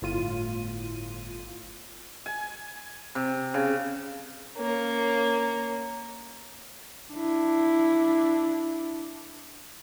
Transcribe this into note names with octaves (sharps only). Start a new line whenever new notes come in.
G1 A2 F4 D#7
G#5
C3
C#3
A#3 C#4
D4 E4